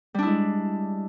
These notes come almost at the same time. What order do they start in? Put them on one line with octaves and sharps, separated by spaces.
G3 D4 E4 G#3